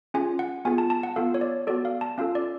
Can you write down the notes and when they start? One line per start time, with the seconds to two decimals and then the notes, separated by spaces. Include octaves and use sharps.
0.14 C#4 F4 G#4 G#5
0.39 F#5
0.65 B3 F4 G#4 G#5
0.78 A5
0.90 A5
1.03 F#5
1.16 B3 F4 A4 F5
1.34 C#5
1.41 D5
1.67 B3 F#4 A4 D5
1.85 F5
2.01 A5
2.18 C#4 F4 A4 F5
2.35 D5